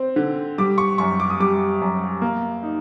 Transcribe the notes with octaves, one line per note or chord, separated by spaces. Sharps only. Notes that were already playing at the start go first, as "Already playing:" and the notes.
Already playing: C4
D3
G3 D6
C#6
F#2 C#6
D6
D#6
G3 D6
F#2
A#3
D#4